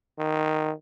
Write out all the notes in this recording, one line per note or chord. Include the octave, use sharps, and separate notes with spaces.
D#3